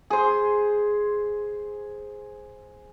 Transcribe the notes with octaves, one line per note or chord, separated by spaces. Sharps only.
G#4 C5